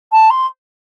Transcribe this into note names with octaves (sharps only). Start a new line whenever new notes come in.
A5
C6